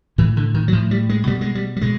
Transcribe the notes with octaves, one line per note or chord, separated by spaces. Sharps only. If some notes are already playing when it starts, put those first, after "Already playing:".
A2 E3
D3
D#3
F#3
A2 F3
G3
G#3
B2 G3
G#3
G3
G3
B2 G#3